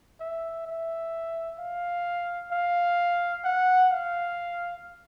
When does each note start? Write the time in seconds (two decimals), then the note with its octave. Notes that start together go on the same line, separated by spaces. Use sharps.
0.20 E5
0.66 E5
1.59 F5
2.52 F5
3.45 F#5
3.92 F5